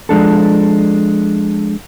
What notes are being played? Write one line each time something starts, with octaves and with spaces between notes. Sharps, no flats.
F3 G#3 D4 A4